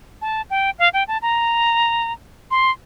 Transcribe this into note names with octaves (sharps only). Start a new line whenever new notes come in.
A5
G5
F5
G5
A5
A#5
C6